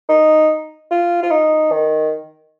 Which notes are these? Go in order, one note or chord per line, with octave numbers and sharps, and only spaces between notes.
D#4
F4
F4
D#4
D#3